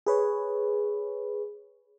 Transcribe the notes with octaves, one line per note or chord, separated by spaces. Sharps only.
G#4 B4 C#5